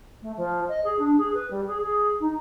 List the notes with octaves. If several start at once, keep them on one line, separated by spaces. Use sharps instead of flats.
A3
F3
D#5
G#4
D4
G#4
B4
G3
G#4
G#4
D#4